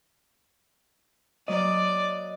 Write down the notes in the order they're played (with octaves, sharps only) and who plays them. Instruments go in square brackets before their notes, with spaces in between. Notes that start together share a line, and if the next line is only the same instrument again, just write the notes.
[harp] F#3 A#3 [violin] D5 [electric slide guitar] D#5